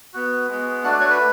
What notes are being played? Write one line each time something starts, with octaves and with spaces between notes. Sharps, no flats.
B3 F#4
G#3 B3 F#4
A3 D4 F#4 F#5
D5
C#5
B4